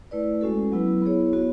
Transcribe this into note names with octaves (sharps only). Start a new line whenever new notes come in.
A3 E4 B4 D5
G#3 C#4 F#4 A4
F#3 B3 E4 B4
B3 E4 G#4 C#5
B3 F#4 C#5